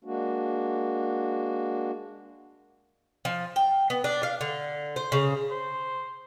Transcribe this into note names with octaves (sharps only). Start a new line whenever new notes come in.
G#3 A#3 D4 F#4
F3
G5
B3
D4
F5
D3
C5
C#3
C5